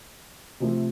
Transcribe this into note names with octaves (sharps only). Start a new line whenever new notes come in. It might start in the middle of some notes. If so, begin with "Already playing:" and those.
C3 F3 A3